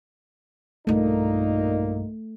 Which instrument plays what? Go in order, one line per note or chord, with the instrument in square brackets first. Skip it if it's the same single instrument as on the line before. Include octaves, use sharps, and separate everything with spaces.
[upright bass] B1 G2 [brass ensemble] A#2 A#3 D#4 [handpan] A3